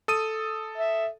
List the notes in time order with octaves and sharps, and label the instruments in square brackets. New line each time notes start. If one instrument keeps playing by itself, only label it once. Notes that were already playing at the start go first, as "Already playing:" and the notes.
[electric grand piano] A4 D#6 D#7
[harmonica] E5